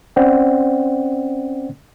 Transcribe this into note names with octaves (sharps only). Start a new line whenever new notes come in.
C4 C#4 C5 D5 F#5 G5